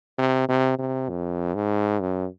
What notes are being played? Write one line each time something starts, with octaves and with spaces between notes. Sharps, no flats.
C3
C3
C3
F2
G#2
F#2